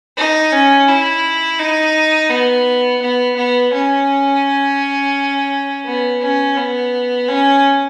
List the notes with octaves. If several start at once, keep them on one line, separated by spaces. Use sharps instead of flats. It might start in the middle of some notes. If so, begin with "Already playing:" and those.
D#4
C#4
E4
D#4
B3
B3
B3
C#4
B3
C#4
B3
C#4